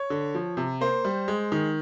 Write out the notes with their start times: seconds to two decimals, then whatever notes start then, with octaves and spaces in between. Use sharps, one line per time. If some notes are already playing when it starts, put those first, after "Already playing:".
Already playing: C#5
0.10 D3
0.35 F3
0.57 C3
0.81 A#3 C5
1.05 G3
1.28 G#3
1.52 D#3